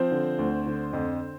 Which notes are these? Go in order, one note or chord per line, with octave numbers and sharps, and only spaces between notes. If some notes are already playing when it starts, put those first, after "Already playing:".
Already playing: F3 C4 C5
D3
D2
D3
F2